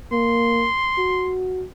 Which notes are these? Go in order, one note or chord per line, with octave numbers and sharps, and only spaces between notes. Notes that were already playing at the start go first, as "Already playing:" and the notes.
A#3 C6
F#4